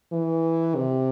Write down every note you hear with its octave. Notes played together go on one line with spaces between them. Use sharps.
E3
C3